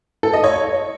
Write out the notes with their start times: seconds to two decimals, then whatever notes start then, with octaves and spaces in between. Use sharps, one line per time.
0.23 A4
0.33 D#5
0.44 C#5